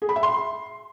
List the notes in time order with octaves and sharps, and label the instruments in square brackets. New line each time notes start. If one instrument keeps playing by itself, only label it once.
[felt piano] G#4
B5
E5
C6